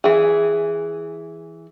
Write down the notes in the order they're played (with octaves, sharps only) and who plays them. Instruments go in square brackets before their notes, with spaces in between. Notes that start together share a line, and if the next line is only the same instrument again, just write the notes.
[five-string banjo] E3 G#4